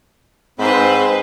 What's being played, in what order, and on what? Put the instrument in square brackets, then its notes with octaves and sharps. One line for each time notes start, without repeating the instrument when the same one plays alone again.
[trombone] G#2 [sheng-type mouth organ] C4 B5 [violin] B4 C5